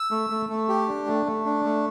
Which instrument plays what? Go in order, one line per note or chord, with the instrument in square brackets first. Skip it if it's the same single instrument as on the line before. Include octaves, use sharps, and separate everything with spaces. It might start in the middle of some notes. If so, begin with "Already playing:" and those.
Already playing: [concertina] E6
A3
A3
A3
G4
D4
A3
A3
D4
A3